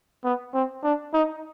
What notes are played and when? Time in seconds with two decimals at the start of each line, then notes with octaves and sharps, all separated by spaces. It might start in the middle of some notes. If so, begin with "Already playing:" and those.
0.24 B3
0.54 C4
0.84 D4
1.14 D#4